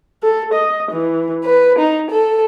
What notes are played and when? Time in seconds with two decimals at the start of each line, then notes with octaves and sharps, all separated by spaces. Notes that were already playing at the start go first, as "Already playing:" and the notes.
0.23 A4
0.54 D#5
0.90 E3
1.44 B4
1.78 D#4
2.11 A4